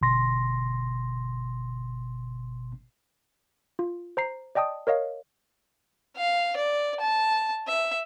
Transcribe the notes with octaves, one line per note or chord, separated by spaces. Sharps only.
G1 B2 C6 A#6
F4
C5 A#5 C7
D5 D#5 G5 A5 D#6
A#4 C#5 D#5 F5
F5
D5
A5
E5